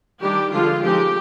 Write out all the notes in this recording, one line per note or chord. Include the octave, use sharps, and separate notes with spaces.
D#3 G3 D4 G4
D3 F3 G#3 F4
F3 G#3 C4 D#4 G4